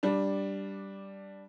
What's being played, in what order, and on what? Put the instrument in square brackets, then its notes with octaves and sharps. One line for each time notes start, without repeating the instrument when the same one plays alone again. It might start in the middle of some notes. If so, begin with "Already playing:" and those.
[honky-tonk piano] G3 D4